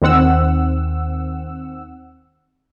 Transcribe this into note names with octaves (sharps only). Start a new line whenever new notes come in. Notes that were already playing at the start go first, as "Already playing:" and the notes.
D#2 D#3 C4 F#5 E6